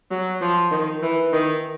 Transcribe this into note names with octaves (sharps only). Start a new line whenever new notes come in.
F#3
F3
D#3
E3
D#3